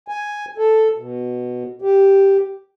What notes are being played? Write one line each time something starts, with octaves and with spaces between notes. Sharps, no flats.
G#5
A4
B2
G4